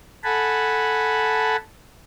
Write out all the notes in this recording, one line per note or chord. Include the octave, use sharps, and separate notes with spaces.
A4 F#5 G#5 A5 B5